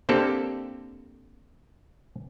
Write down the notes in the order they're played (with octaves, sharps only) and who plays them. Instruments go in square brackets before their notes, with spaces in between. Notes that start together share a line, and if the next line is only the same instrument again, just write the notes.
[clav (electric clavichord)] D3 A#3 C4 G4 A4